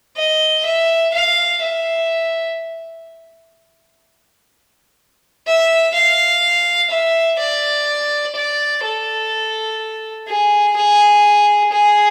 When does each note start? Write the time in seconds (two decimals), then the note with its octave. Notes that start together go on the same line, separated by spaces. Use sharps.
0.17 D#5
0.65 E5
1.14 F5
1.62 E5
5.47 E5
5.94 F5
6.90 E5
7.39 D5
8.36 D5
8.83 A4
10.28 G#4
10.76 G#4
11.72 G#4